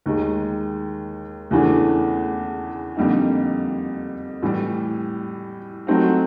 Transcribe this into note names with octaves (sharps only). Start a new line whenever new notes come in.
D#2 D#3 G#3
E2 C#3 E3 A3 D4
F2 D3 G3 A#3 D#4
A2 E3 G3
F#3 A3 C4 D#4